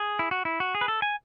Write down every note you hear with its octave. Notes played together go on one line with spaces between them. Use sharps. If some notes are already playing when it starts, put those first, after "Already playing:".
Already playing: G#4
E4
F#4
E4
F#4
G#4
B4
A4
G#5